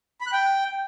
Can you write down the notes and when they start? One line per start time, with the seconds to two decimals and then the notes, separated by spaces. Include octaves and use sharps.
0.21 B5
0.27 F#6
0.32 G5